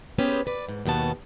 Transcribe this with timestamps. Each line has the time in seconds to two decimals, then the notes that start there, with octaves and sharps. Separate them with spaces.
0.19 B3 C#4 G4 G#4 B4 C5
0.47 B4 D5
0.69 G#2
0.86 D#2 B2 B3 A5